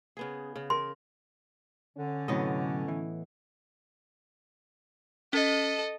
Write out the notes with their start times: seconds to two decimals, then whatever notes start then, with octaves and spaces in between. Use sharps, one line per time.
0.17 C#3 B3 G#4
0.56 C#3
0.70 A#4 C6
1.97 D3 C#4
2.28 A2 C3 F#3 B3 D#5
2.88 E3
5.33 C#4 A4 D#5